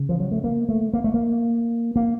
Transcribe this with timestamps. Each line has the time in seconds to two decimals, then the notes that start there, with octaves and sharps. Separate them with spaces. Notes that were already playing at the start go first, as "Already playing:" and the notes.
Already playing: C#3
0.09 F3
0.20 F#3
0.32 A3
0.44 A#3
0.69 A3
0.93 A#3
1.04 A3
1.14 A#3
1.96 A#3